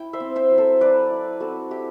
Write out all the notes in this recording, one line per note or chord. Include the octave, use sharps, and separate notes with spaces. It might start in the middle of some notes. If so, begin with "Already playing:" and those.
Already playing: E4 G5
C5 E5
C4
C5 E5
F#3
A4 C5
F#3 B4 D5
E4
C4 F#4 A4
E4 G4